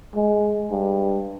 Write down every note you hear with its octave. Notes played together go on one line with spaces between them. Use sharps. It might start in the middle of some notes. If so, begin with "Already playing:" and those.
G#3
G2